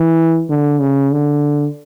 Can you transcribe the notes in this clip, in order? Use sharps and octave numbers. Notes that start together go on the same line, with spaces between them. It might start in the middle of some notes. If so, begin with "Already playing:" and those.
Already playing: E3
D3
C#3
D3